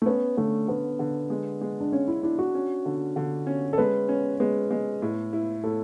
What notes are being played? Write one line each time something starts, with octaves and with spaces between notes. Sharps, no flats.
A3
B3 C#4
D3 A3
D3 B3
D3
G#3
G#3
D4
C#4 C#5
E4
D4 E4
F#4
C#4
D3
D3
C#4
A4
G#3 B4
C#4
G#3 B4
G#3
A2
E4
A2 A4